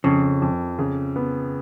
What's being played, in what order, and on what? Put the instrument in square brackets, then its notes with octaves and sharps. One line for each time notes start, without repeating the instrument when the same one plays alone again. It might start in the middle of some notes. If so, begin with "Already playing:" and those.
[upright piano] F2 [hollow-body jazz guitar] C#3
[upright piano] F2
C#3
B3